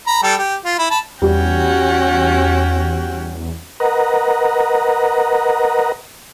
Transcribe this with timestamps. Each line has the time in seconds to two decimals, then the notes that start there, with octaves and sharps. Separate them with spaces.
0.07 A#5 B5
0.23 G3 G4 A4
0.38 G4
0.65 F4
0.79 E4
0.91 A5 B5
1.22 E2 G3 C#4 F#4 G5
3.80 A#4 B4 D#5 F#5 A#5